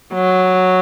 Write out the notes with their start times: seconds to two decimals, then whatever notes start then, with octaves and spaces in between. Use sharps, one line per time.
0.14 F#3